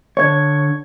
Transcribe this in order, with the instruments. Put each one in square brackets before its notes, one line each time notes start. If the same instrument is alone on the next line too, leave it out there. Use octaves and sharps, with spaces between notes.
[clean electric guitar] D3 C#5 [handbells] C#6 G#6